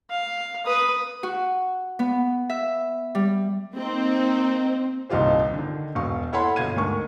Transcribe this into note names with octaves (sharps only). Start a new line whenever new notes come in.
F5
B4 D#6
F#4
B3
E5
G3
A#3 C4 D#4
D#1 C2 D#4 F4 G4 C5
D3 D#3
E1 B2 F5 C#6
E4 A4 C#5 F#5 B5 C6
G1 B2 F5 G#6 D#7
D2 G#2 A#4 C#6